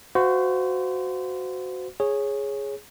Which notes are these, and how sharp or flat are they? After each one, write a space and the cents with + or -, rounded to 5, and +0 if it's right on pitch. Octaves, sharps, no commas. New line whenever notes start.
F#4 +0 C5 -30 F5 +0
G#4 +0 C#5 -10